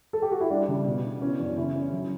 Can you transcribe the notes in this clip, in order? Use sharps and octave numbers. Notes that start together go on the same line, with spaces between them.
A4
G4
F#4
E4
G3 D4
C#3
B2
B3
E3 C#4
F#2 D4
C#3 C#4 E4
C#4
F#3